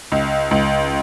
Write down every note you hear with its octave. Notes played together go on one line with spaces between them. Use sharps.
C#2
C#2